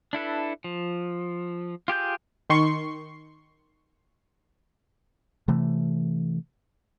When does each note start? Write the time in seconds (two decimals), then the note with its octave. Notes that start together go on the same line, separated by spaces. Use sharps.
0.13 D4 E4 A4 B4
0.64 F3
1.88 F4 G4 G#4 G6
2.50 D#3 C6 C#6 C7
5.48 C3 E3 A3